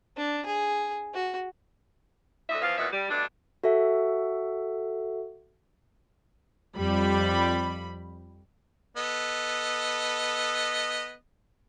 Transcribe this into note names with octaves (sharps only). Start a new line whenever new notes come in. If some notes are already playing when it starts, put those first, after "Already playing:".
D4
G#4
F#4
D2 D3 D#5 E5
E2 F3 F4 F5
E2 A#2 F#4 D#5 E5
G3
G2 B2 A3 D4
F#4 A4 E5 F#5
F2 G3 B5
B3 A4 D#5